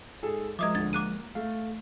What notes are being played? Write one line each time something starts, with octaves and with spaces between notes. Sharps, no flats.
G#2 G#4 A4
F3 G#3 A#4 D#5 E5 D6 D#6 G#6
D2 D3 G#6 A6
A#3 D6 F#6 D#7
A3 F5